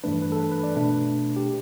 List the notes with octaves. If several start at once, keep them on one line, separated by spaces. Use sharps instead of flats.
G2 E3 A3 D4 B4
B4
A4
B4
B4
D5
B2 A3 D4 B4
G4